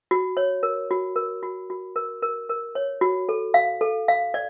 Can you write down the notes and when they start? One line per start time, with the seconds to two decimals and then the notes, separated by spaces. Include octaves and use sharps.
0.11 F#4
0.37 C#5
0.63 A#4
0.91 F#4
1.16 A#4
1.43 F#4
1.70 F#4
1.96 A#4
2.22 A#4
2.49 A#4
2.75 C#5
3.01 F#4
3.29 A4
3.54 F5
3.81 A4
4.08 F5
4.34 D5